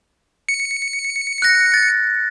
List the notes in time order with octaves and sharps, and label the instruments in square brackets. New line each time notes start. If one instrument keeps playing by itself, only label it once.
[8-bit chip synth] C#7
[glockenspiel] F#6 A#6
A6